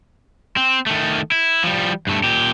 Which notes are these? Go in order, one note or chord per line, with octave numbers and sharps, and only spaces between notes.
C4
D#3 A3
E4
F3 G3
G2 A3
A#2 G4